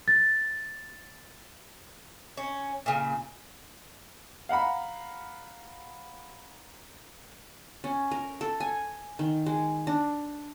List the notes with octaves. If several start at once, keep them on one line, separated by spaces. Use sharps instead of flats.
A6
C#4
A#2 C#3
F5 F#5 A#5 B5
C#4
A#4
A4
G#5
D#3
G#3
D4